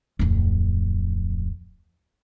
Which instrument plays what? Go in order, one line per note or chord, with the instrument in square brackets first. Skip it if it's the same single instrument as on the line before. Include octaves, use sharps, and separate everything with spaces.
[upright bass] D1 F2